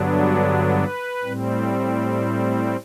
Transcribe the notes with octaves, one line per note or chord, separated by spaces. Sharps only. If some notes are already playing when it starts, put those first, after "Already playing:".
Already playing: G2 D3 F#3 B3 D4
F#4
B4
A2 G3 C4